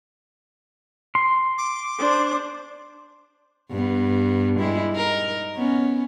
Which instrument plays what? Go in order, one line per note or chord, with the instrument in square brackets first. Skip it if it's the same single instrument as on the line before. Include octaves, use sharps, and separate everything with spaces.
[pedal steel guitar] C6
[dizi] D6
[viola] D4 C5
[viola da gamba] G2 B3
G3 G#3 E4
D#4 A#4
B3 C#4